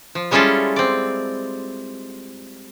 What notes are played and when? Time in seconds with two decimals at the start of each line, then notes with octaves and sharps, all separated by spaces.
0.15 F3
0.31 G3 G#3 C#4 E4 F4 A4
0.76 C4 D5